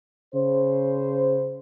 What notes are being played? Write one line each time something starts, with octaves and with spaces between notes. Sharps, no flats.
C#3 C5